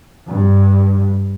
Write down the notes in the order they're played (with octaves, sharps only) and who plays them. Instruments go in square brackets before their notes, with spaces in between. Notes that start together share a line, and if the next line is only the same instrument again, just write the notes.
[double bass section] G2